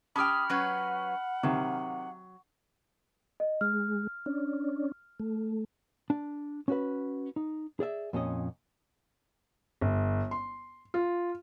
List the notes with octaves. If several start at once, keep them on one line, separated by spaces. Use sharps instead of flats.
C#4 G4 G5 A5 B5 D#6 F6
F#3 C#4 B4 F#5
C3 D#3 F#3
D#5
G#3 F6
C#4 D4
A3
D4
C#4 F#4 B4
D#4
G#4 D5 E5
F2 A#2 C#4 D#5
G1
C6
F4